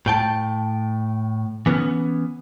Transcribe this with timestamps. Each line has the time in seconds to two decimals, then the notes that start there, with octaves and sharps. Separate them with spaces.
0.06 A2 G5 A5
1.66 E3 B3 C#4